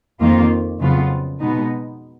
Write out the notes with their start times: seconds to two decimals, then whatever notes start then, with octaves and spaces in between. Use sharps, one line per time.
0.20 F2 D#3 A#3 F4
0.80 F2 C#3 F#3 B3 F4
1.40 B2 G#3 B3 D#4